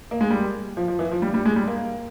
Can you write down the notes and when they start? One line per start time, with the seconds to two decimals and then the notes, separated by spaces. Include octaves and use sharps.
0.11 A#3
0.21 G#3
0.30 G3
0.77 F3
0.88 F3
0.99 E3
1.11 F3
1.22 G3
1.34 G3
1.45 G#3
1.56 G3
1.68 A#3